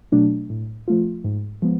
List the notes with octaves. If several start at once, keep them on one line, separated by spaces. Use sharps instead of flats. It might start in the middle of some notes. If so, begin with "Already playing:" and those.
B2 F#3 A3 D4
A2
F3 A3 F4
G#2
F3 G#3 B3